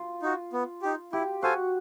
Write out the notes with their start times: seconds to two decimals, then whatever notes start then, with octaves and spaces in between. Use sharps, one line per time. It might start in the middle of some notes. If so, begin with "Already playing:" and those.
Already playing: F4
0.22 D#4 F#4
0.53 B3
0.82 D#4 G4
1.12 E4 G4
1.43 F#4 A4 C5 F5 G#5